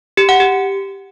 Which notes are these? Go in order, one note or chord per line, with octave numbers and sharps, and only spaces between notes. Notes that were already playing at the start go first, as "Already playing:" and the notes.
G4
F#5
G4